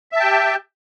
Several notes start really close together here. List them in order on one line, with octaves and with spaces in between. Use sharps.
E5 A5 G5 G4